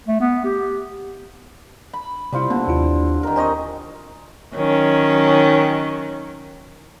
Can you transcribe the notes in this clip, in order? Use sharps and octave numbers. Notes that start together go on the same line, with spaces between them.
A3
B3
G4
B5
C3 G3 C4 E4 F4
D3 A#3 B3
D#2 E4 F4
D#3 A#4
C4 D#4 D#5 G#5 C#6
D#3 F#3 C#4